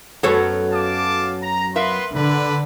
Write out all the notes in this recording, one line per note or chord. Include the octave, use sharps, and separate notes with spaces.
F#2 F#3 B3 A4 C#5
F5 A5 D6
A#5
B3 A#4 B4 E5 F5 C6
D3 D4 B4 B5